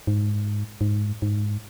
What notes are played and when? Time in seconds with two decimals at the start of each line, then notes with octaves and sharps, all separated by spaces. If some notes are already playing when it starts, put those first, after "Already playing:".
0.07 G#2
0.81 G#2
1.22 G#2